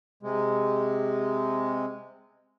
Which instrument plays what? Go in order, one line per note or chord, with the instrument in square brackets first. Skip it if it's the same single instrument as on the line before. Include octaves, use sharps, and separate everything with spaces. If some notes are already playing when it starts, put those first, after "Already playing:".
[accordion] C3 G#3